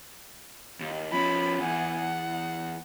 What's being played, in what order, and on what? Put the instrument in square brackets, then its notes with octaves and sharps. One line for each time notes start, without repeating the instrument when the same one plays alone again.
[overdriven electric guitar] D#2
[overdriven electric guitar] F3 C#4 [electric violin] B5
[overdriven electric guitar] E2 [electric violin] F#5 G#5
[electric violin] F#5